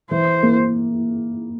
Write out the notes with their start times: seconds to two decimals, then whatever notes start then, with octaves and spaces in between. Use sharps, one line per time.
0.11 E3 C5
0.43 A#3